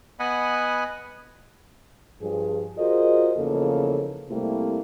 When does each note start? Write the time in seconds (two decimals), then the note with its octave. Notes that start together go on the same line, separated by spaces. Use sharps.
0.20 B3 D#5 F#5 G#5 B5
2.21 G2 F3 G#4
2.78 F4 F#4 G#4 A#4 C5 D#5
3.35 E2 C#3 F3 A#3 D#4 A4
4.29 C3 G3 A3 A#3 C4 E4